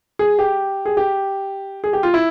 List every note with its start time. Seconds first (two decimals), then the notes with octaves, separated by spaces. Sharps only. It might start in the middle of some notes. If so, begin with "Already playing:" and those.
0.19 G#4
0.39 G4
0.86 G#4
0.97 G4
1.84 G#4
1.93 G4
2.03 F4
2.14 E4